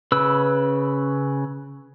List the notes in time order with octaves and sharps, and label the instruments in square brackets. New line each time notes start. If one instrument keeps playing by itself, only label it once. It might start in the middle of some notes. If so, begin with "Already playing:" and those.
[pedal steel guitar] C#3 B4 E6